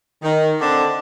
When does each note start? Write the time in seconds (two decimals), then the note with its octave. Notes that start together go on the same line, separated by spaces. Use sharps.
0.23 D#3
0.61 D3 C4 D4